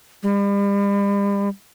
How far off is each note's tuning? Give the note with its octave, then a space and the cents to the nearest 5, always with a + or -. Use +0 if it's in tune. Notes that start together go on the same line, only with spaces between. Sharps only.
G3 +40